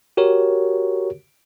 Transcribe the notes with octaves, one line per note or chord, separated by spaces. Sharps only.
F#4 G4 A#4 C#5